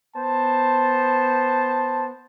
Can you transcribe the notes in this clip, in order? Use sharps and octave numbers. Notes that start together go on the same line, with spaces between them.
B3 C5 A5